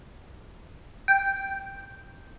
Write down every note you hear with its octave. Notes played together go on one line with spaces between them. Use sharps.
G5